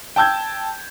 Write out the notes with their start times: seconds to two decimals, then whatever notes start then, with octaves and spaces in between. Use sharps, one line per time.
0.16 G5 A5 E6 G6 G#6